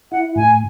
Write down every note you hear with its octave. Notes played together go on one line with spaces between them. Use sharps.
E4 F#5
A2 G#5